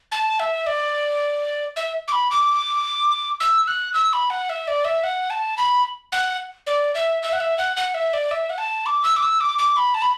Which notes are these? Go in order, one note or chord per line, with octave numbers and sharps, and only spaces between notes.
A5
E5
D5
E5
D6
B5
D6
E6
F#6
E6
B5
F#5
E5
D5
E5
F#5
A5
B5
F#5
D5
E5
E5
F#5
E5
F#5
F#5
E5
D5
E5
F#5
A5
D6
E6
D6
E6
D6
D6
B5
A5
B5